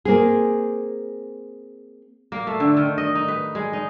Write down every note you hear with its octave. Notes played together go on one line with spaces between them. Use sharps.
A#3 C4 G#4
A#3
A3
D3
D#3
D#5
D#4
B4
G#3
D#4